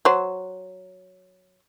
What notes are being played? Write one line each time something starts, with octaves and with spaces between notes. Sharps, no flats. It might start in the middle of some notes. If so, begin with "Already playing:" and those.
F#3 C5